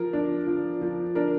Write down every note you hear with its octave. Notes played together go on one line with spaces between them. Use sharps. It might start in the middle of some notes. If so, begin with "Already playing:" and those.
Already playing: F3 A#4
D4
F3
F3
D4 A#4